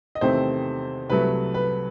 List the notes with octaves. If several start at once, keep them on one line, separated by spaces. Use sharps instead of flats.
D#5
E2 C3 D#3 A3 C4 C5
C2 C3 F#3 A3 B4
B4